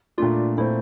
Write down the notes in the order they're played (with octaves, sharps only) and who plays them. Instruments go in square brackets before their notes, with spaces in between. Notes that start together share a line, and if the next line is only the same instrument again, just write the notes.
[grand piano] A#2 A3 D4 [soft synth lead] F4
[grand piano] A#2 A3 C4 [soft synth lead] E4